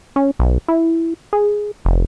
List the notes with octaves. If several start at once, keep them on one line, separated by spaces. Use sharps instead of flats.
C#4
B1
E4
G#4
F1